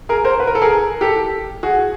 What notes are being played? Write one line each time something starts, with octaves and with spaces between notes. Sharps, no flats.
G#4 A#4
A#4 C5
B4
A#4
A4
G#4 A#4
G4 A4
F#4 G#4